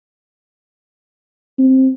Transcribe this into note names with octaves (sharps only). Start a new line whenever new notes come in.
C4